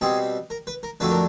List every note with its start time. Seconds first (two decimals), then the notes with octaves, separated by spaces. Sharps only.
0.01 B2 G3 C4 G#4
0.50 A#4
0.67 B4
0.83 A#4
1.00 F2 D3 F#3 A3 D4 B4
1.11 A#4